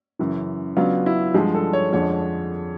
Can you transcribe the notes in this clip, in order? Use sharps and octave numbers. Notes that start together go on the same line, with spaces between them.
F#2 C#3 E3
C#3 F#3 B3 D4 F4
E4
G2 D3 F3 G#3 G4
A4
C#5
F2 D3 F3 G#3 C#5